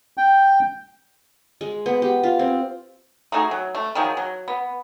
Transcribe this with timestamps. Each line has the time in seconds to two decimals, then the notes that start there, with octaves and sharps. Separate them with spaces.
0.17 G5
1.61 G#3
1.86 B3
2.02 G4
2.23 F4
2.39 C4
3.32 A3 D#4 F#4 G#4
3.51 F#3
3.75 A3
3.95 D#3 F3 F#3 G#4
4.17 F#3
4.48 B3